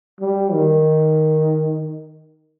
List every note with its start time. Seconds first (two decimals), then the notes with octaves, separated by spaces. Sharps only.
0.20 G3
0.53 D#3